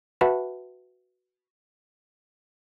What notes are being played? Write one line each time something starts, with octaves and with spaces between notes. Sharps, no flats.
F#4 B4 E5 F#5 A5 B5